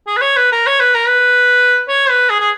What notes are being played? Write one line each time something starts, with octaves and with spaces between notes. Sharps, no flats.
G#4
B4
C#5
B4
A#4
C#5
B4
A#4
B4
C#5
B4
G#4
G#4